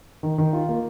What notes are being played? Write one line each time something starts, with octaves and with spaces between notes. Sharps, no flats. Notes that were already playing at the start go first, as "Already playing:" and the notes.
D#3
D#3
F4
A#3